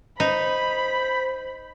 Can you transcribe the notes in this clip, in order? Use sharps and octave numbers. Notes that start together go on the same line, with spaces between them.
D#4 C5 B5